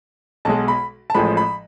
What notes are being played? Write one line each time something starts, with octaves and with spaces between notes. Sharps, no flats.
B1 B2 G#3 A5
B5
A5
A1 A2 F3 G#3 B5
B5